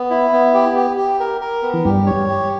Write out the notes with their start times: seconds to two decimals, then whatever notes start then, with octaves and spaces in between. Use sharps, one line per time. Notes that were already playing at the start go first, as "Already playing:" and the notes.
Already playing: B3
0.11 E4
0.33 B3
0.54 G4
0.76 G4
0.97 G4
1.20 A#4
1.41 A#4
1.62 B3
1.73 E3
1.85 G2 G3 G4
2.06 C#5
2.28 G4